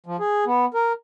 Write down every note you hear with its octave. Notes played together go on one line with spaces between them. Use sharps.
F3
G#4
B3
A#4